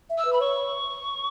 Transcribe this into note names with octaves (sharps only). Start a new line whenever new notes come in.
E5
E6
B4
B5
C#5 C#6